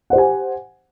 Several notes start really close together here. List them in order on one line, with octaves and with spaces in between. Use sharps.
F#5 C5 G4 G#5